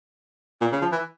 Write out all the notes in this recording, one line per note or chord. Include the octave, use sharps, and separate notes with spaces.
A#2
C#3
F3
E3